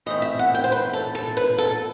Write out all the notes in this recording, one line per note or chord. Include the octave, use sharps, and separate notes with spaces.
E3 A3 C4 D#5
E5
F#5
G5
C5
B4
A4
A4
B4
A4